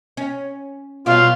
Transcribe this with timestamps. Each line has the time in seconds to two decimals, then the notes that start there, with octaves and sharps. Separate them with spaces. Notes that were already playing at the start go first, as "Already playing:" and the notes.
0.17 C#4
1.06 B2 F#3 G3 F4 F5